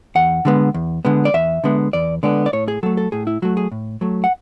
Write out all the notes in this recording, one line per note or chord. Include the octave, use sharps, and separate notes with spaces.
E2 F#5
D3 G#3 B3
E2
D3 G#3 B3
D5
E2 E5
D3 G#3 B3
E2 D5
D3 G#3 B3 D5
D5
A2 C#5
G#4
F#3 A3 A4
A4
A2 G#4
E4
F#3 A3 F#4
G#4
A2
F#3 A3
F#5